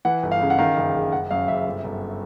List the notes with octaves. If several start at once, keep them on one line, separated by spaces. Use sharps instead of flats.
E3 F#5
G1
F5
C#3
F#5
D#3 F5
F#1
F#1
F#1 F#5
F#2 F5
F#1 E5
G1
G1